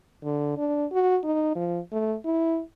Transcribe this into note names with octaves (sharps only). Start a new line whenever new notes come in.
D3
D4
F#4
D#4
F3
A3
E4